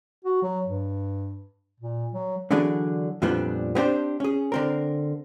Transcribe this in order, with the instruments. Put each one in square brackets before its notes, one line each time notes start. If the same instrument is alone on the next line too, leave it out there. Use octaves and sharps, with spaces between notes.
[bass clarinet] F#4
F#3
G2
A#2
F#3
[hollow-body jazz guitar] D3 E3 F#3 D4 G#4
F2 A#2 F3 G3 B3 D4
B3 C4 D4 G4 C5
C#4 G#4
D3 C4 A#4